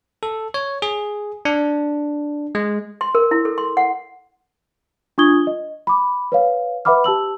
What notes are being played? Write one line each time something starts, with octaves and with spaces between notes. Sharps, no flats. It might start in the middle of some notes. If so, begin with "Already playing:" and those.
A4
C#5
G#4
D4
G#3
C6
A#4
E4
A4
C6
F#5
D4 F4 C#6 D#6 G#6 G7
D#5
B5 D6
B4 C#5 F5
B4 E5 F#5 B5 D6 F6
G4 A5 E6 F#7